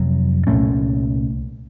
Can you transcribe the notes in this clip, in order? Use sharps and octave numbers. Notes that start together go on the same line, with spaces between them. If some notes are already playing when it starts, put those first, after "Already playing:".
Already playing: F2 C3 F#3
C2 A#2 A3 C#4